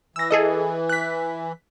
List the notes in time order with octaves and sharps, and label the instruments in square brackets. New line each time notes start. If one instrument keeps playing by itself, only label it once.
[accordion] E3 [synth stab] E6 A#6
[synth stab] G#4 A4 D#5
F#6 B6